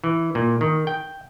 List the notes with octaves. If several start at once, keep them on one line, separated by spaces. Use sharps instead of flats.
E3
A#2
D#3
G5